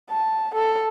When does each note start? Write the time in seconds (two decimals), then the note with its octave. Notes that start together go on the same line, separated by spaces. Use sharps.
0.10 A5
0.54 A4